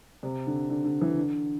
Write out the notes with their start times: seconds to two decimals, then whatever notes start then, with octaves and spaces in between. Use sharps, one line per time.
0.23 C3
0.47 D3
0.70 D3
0.85 D3
1.01 E3
1.17 D3